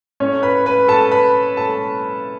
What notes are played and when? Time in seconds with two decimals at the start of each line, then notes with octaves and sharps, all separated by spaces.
0.20 A2 A3 C#4 C#5
0.43 B4 B5
0.66 B4 B5
0.88 A4 A5
1.11 B4 B5
1.57 A4 A5